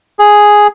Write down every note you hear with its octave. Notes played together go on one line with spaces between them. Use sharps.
G#4